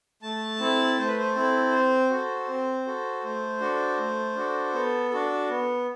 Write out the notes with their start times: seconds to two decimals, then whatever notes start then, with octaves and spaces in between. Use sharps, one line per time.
0.22 A3 A5
0.60 C4 E4 A4
0.98 A3 C5
1.07 B4
1.18 C5
1.35 C4 E4 A4
1.73 C4
2.10 F#4 A4
2.48 C4
2.86 F#4 A4
3.23 A3 C5
3.61 D4 F#4 A4
3.98 A3
4.35 D4 F#4 A4
4.74 B3 A4
5.11 D4 F#4 A4
5.49 B3